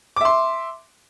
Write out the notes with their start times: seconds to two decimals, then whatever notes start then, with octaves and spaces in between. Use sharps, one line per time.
0.16 D6
0.21 E5
0.25 C6